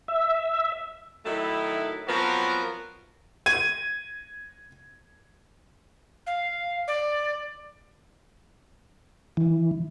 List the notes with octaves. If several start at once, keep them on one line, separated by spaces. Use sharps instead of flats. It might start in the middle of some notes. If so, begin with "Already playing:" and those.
E5
D#3 F#3 A3 D#4 E4
F3 F#3 B3 C4 F#4 A#4
G#6 D#7
F5
D5
E3